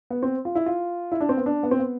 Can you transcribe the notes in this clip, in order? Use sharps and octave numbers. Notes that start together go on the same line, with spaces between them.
B3
C4
F4
E4
F4
E4
D4
C4
B3
D4
B3
C4
B3